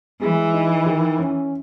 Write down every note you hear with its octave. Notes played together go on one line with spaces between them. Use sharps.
E3 G#3
D#4
D#3
C#4